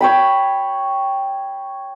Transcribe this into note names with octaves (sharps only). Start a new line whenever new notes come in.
C#5 G5 B5